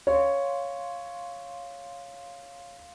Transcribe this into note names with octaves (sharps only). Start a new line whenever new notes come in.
C#5 F5 C6